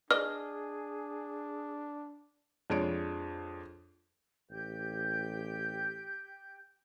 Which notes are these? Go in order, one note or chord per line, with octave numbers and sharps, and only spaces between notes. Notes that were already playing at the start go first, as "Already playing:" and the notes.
D4 G#4 D5 D#5 F6
F2 G#3 D4 F4 C#5 D7
A1 G4 G5 G6